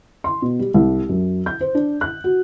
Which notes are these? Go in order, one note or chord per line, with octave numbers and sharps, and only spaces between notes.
C6
B2
G3
C2
F#2
G6
C5
D4
F#6
F#4